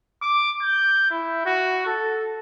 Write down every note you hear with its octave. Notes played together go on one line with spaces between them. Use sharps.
D6
G6
E4
F#4
A4